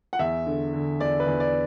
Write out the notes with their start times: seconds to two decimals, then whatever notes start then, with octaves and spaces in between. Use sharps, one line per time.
0.13 F#5
0.19 E2 E5
0.46 D3
0.73 D3
0.99 E2 D5
1.20 B4
1.26 E2
1.40 D5